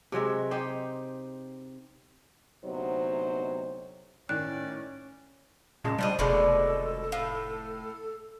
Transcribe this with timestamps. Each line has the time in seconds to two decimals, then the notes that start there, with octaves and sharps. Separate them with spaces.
0.12 C3 F#3 G#3 E5
0.51 D#4 G4 C5 G5
2.65 D2 C3 F#3 B3 D#4 C5
4.29 A2 D#3 C#4 D5 F#6
5.84 A#2 C#3 G#3 A5
5.98 G3 D4 C5 D#5
6.19 F1 B2 D#3 G#3 A3 A4 D5
7.12 A2 F5